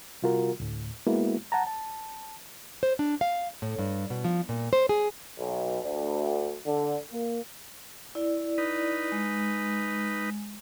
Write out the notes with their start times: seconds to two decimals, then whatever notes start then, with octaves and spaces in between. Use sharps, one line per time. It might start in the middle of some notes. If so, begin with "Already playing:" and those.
0.22 C3 G3 F4 F#4 A#4
0.60 D2 A2
1.07 G#3 A#3 B3 E4 F#4
1.52 F#5 A5 A#5
1.67 A5
2.83 C5
2.99 D4
3.21 F5
3.62 A2
3.79 G2
4.10 B2
4.24 F3
4.49 A#2
4.73 C5
4.89 G#4
5.38 B1
5.83 D2
6.66 D3
7.12 A#3
8.15 E4 D5
8.58 D#4 B4
9.12 G#3